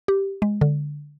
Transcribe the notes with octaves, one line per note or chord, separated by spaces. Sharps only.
G4
G#3
D3